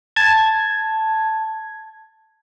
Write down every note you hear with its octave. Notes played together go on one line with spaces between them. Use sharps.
A5 G#6